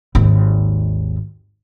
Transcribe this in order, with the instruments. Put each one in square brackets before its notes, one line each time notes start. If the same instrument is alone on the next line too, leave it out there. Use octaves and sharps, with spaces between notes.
[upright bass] G#1 D#2